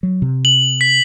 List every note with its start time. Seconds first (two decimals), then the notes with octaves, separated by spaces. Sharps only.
0.03 F#3
0.22 C3
0.45 F#7
0.81 B6